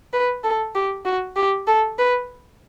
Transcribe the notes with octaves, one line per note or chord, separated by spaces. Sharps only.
B4
A4
G4
F#4
G4
A4
B4